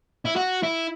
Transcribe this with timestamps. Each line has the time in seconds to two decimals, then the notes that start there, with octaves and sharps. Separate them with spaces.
0.25 E4
0.36 F#4
0.63 E4